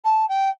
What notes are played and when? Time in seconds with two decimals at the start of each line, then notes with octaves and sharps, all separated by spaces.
0.04 A5
0.28 G5